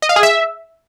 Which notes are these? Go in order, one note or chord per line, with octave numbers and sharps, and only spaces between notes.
D#5
F5
G#4
E5